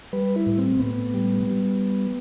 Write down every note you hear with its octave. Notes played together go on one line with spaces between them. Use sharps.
G3 B4
E4
A2
C4
A2 B3
G3
G3